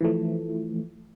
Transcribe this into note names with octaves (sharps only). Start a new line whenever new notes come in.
E3 F3 A3